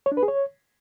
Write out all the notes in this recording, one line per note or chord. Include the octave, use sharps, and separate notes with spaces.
C#5
D4
B4
G#4
C#5